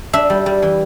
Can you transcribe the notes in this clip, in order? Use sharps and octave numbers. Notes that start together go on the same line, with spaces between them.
D4 E5
G3
G3
E3